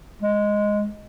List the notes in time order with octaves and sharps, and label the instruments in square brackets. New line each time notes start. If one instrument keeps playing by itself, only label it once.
[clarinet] G#3